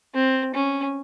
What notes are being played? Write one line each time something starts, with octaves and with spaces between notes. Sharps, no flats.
C4
C#4